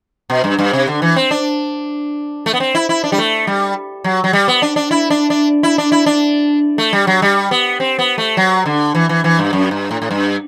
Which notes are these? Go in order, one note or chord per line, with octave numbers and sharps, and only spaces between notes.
B2
G2
G2
C3
D3
E3
C4
D4
A3
B3
C4
E4
E4
D4
G3
A3
G3
F#3
F#3
G3
B3
D4
D4
E4
D4
D4
E4
D4
E4
D4
A3
G3
F#3
G3
B3
C4
B3
A3
F#3
D3
E3
E3
E3
G2
F#2
G2
A2
A2
G2